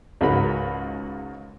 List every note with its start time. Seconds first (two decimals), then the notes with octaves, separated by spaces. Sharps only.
0.21 C#2 G#2 C#3 F#4 A#4 B5